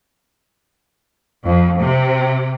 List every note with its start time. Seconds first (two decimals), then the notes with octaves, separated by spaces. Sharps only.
1.45 F2
1.81 C3